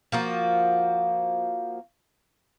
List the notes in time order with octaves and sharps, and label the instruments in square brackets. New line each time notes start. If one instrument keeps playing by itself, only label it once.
[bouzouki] F3 A#3 F#4